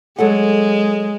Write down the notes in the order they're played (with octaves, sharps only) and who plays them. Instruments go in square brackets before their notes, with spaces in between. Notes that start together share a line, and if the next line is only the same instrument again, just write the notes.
[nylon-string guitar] F#3 A4 F#5 [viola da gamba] G#3